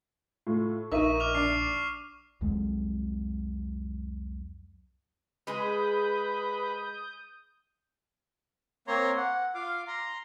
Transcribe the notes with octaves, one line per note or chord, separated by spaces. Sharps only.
A2 F4
A#1 D#4 A#4 E5 C#6 D#7
D6 F6 F7
D4 C7
C2 F2 F#3 G#3
G#3 G#4 B4 D#6 G6
A#3 C4 C#5 A#5 C6
F#5
F4 F5 D6
A#5 C6